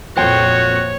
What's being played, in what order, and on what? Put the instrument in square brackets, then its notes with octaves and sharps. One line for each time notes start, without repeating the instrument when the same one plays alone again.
[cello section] F2 A#2 [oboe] F#4 [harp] C5 G5 [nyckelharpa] C#5